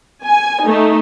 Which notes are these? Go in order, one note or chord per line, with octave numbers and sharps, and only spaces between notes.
G#5
A3 D#4